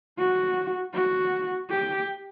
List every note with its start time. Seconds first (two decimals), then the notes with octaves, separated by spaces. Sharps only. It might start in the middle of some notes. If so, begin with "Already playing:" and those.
0.18 F#4
0.94 F#4
1.70 G4